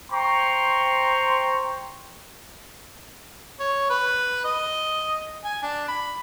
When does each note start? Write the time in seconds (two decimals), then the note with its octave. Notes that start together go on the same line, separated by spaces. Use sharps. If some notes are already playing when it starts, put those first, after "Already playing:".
0.12 C5 G5 A#5 C6 C#6
3.60 C#5
3.90 B4
4.45 D#5
5.45 G#5
5.63 D4
5.88 B5